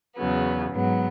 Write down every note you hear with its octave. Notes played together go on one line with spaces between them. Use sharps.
E2 C#3 F#3 B3
G#2 F#3 B3